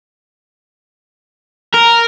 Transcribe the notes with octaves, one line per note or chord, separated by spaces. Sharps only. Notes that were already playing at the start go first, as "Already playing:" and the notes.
A#4